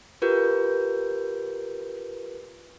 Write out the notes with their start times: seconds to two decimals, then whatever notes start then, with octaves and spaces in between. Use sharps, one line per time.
0.22 F4 G4 A#4 B4 G6